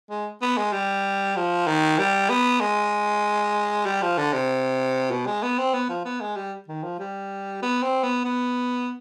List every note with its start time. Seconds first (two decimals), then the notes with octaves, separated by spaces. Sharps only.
0.10 G#3
0.42 B3
0.57 G#3
0.73 G3
1.36 F3
1.67 D#3
1.98 G3
2.29 B3
2.61 G#3
3.86 G3
4.02 F3
4.18 D3
4.33 C3
5.11 B2
5.26 G#3
5.43 B3
5.58 C4
5.74 B3
5.89 F3
6.05 B3
6.21 G#3
6.36 G3
6.68 D#3
6.84 F3
6.99 G3
7.62 B3
7.83 C4
8.03 B3
8.25 B3